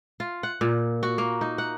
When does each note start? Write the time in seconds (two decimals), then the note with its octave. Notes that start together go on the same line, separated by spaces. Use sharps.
0.20 F4
0.43 F#5
0.61 A#2
1.03 F#4
1.18 A#3
1.41 D#4
1.58 F#5